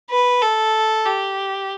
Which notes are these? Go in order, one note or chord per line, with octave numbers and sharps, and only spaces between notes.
B4
A4
G4